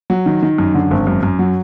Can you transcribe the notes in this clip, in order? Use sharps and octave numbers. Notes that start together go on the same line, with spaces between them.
F#3
D#3
D#3
F#2
D3
G#1
F#2
F#2
F#3